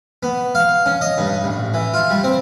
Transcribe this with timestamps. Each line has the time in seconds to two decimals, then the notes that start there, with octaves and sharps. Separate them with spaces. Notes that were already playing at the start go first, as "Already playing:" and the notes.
0.23 B3
0.55 F5
0.86 C#4
1.01 D#5
1.18 G2
1.44 A1
1.74 E3
1.94 F4
2.11 G3
2.24 C4